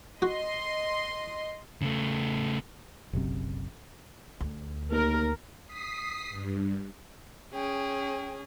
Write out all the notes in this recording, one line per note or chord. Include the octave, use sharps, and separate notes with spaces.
F#4 D#5 C6
C#3 A3
F#1 B1 F#2 C3
D2
D#2 A#4
D#6 B6 C7
G2
C#4 G#4 G5